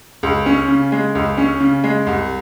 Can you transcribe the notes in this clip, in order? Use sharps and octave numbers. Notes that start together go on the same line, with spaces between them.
C#2
C#4
C#3
G#3
C#2
C#4
C#3
G#3
C2